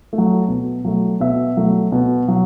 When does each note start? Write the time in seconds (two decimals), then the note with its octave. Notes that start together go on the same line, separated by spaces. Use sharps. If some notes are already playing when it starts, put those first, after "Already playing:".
0.13 A3
0.18 F#3
0.48 B2
0.85 F#3 A3
1.20 B2 E5
1.57 F#3 A3
1.92 B2
2.28 F#3